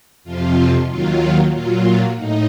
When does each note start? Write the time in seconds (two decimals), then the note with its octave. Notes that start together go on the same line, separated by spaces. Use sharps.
0.24 F2 C3 F3 F4
0.88 D#2 D#3 F#3 F4
1.52 A#2 F#3 F4
2.17 A2 D#4